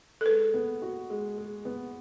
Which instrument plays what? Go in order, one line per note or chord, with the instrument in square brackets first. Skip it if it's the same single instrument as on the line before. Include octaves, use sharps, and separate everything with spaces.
[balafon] A4
[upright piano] G#3 [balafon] B4
[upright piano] B3
F#4
G#3
G#3
B3